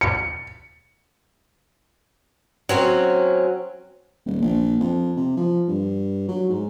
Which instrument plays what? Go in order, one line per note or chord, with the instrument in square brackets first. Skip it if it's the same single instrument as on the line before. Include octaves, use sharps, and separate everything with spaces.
[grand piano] C#7
[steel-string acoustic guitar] F#3 C4 C#4
[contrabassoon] D#1
A#1
F2
C3
F3
G2
F#3
G#2